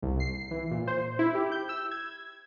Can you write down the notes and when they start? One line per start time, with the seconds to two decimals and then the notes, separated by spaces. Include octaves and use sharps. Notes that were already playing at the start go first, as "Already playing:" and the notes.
0.02 C2
0.20 C7
0.51 E3
0.71 A#2
0.87 C5
1.19 E4
1.35 G4
1.52 G6
1.69 E6
1.91 G#6